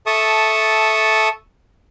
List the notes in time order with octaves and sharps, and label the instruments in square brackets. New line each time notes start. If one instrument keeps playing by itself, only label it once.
[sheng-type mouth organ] A4 E5 A5 C#6 D#6